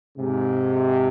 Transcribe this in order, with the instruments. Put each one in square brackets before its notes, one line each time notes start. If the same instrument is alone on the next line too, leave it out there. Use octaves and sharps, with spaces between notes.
[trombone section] G#2 C3